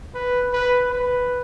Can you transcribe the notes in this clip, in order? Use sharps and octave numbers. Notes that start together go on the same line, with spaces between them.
B4
B4
B4